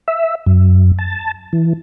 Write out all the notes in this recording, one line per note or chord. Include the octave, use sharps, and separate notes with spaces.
E5
F#2
A5
E3